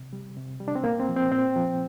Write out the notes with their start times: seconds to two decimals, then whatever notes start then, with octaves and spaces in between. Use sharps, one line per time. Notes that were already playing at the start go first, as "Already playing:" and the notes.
Already playing: C3
0.13 G3
0.37 C3
0.60 G3
0.68 D4
0.75 C4
0.84 A#2 A#3
1.00 C4
1.09 F3
1.17 C4
1.31 A#2 C4
1.56 F3